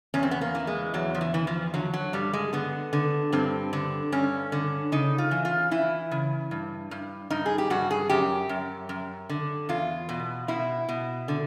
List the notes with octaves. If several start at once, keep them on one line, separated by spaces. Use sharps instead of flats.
E2 C#4
C4
B3
A#3
E3
G#3
E2 F#3
F3
E3
E3
F3
D3 F#3
F#3
G2 G3
G#3
D3 B3
D3
G2 C4
D3
G2 C#4
D3
C#3 D#4
F4
E3
F4
E3 E4
C#3
G2
G2
G2 D#4
G#4
G4
G2 F#4
G#4
F#2 G4
F#2
F#2
D3
E2 F4
B2
B2 E4
B2
D3